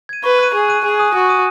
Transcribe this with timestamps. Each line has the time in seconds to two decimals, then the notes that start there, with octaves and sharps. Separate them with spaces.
0.09 G#6 D#7
0.24 B4 C#6
0.39 F#6 D#7
0.54 G#4 C#6
0.68 F#6 D#7
0.83 G#4 G#5
0.99 D#6 F#6 D#7
1.14 F#4 G#5
1.29 D#6 F#6 D#7